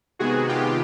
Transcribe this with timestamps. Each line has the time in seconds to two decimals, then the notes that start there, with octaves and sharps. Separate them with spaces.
0.19 C3 D#3 G#3 B3 F#4 G#4
0.48 F4 G4